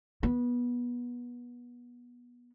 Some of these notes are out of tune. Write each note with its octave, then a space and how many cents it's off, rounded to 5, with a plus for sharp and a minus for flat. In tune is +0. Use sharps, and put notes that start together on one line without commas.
B3 -25